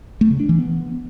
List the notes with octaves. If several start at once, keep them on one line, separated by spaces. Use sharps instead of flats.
A3
C#3
D4
E3
B3